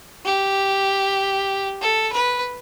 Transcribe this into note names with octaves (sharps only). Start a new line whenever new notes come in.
G4
A4
B4